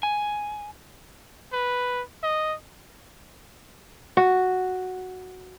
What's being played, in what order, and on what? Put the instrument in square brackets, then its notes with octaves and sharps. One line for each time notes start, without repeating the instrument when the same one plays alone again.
[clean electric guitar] G#5
[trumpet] B4
D#5
[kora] F#4